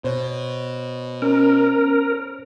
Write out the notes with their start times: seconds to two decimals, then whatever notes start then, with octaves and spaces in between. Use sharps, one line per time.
0.04 B2 C5 C#5
1.22 C#4 A#4